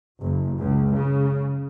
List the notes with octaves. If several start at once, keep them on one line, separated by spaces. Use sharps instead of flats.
F#1
C#2
C#3